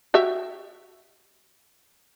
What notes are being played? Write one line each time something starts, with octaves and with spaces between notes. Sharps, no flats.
F#4 G4 E5